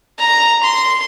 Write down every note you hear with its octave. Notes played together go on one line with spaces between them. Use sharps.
A#5
C6